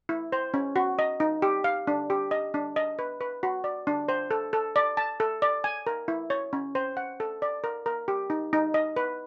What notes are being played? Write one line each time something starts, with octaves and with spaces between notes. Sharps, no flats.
E4
C5
C#4
F#4
D#5
D#4
G4
F5
D4
G4
D#5
D4
D#5
B4
B4
F#4
D5
D4
C5
A4
A4
D5
A5
A4
D5
G#5
A#4
E4
C#5
C#4
C5
F#5
A4
D5
A#4
A#4
G4
D#4
D#4
D#5
B4